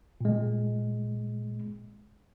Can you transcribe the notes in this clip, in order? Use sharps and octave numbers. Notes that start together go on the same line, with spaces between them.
A#2 G#3